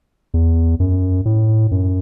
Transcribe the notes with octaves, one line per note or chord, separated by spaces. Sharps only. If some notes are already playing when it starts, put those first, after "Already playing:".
E2
F#2
A2
F#2